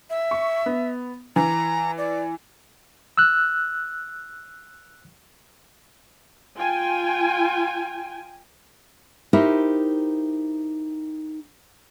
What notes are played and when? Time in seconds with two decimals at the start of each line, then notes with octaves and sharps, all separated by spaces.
0.10 E5
0.31 C#6
0.66 B3
1.36 E3 A#5
1.98 D5
3.17 E6 F#6
6.59 F4 G5 G#5
9.33 D#4 E4 G4 A#4 C5